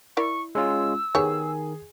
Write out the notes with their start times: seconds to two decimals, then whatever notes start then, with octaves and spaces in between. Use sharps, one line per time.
0.17 E4 A#4 D5 C#6
0.55 G#3 C#4 F4 E6
1.15 D#3 B3 G4 G#4 C#5